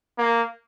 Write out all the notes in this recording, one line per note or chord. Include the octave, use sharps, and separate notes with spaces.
A#3